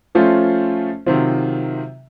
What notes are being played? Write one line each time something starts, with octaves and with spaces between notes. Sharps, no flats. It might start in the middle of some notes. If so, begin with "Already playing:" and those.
F3 A3 C#4 F4 C5
C3 D#3 F#3 C4 F4